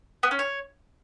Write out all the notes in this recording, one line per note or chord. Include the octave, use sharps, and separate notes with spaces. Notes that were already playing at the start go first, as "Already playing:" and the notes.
B3
C#4
C#5